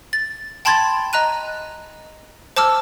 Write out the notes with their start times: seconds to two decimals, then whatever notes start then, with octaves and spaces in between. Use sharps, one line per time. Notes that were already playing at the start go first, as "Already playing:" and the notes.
0.13 A6
0.65 G5 A5 B5 C6 G#6 A6
1.13 D#5 A#5 F#6 D#7
2.57 C5 A5 D6 E6 F6